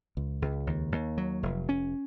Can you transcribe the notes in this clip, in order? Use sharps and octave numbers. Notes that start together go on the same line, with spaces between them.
C#2
C#2
D#2
D#2
F#3
F1
C#4